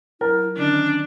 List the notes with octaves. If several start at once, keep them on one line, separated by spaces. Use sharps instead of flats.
F#3 E4 A#4
D3 D#3 C#4 D4